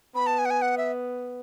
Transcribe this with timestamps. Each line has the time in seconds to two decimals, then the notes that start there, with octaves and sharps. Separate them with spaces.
0.15 B3 B5
0.27 A5
0.39 G#5
0.45 F#5
0.50 G#5
0.62 F#5
0.78 E5